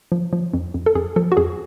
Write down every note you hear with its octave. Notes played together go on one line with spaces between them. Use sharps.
F3
F3
F2
F2
A4
F2 G#4
F3 A4
F#4
F2 G#4